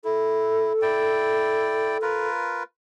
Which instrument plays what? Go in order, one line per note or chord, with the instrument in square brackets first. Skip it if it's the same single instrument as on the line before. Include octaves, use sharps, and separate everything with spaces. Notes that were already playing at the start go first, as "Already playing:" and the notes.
[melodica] E4 [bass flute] A4
[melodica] E4 D5 G5
F4 A#4 B4